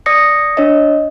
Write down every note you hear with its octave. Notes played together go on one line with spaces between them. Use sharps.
D5 D#6 A#6 C#7
D4 C#5 D#5